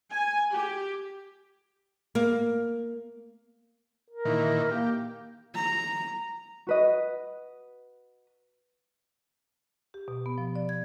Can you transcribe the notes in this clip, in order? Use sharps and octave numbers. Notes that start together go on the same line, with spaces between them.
G#5
G4
A#3
A#4
A#2 D#3 E3
A#3 G4
A#5
F#4 B4 D#5
G4
B2
B3
F3
D5
G#6